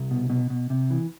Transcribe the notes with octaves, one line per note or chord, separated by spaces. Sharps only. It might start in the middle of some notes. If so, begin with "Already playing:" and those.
Already playing: C2
B2
B2
B2
C3
E3